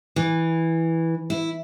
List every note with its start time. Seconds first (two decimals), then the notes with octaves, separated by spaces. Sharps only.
0.16 E3
1.30 E4